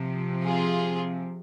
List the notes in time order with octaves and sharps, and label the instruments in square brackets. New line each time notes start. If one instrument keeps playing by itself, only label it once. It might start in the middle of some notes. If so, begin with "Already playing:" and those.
Already playing: [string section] C3 F3
F4 G#4